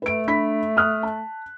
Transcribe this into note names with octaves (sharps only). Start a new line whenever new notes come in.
A3 B4 D7
D4 B5 B6
D#6 F6 F#6
A5